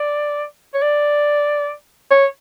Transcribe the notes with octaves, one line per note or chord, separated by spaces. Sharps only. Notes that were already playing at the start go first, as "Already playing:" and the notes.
Already playing: D5
C#5
D5
C#5